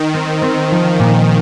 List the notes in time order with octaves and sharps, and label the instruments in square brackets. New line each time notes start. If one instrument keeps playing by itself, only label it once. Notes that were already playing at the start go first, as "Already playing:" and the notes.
Already playing: [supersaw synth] D#3
[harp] C4
C4
F3
A#2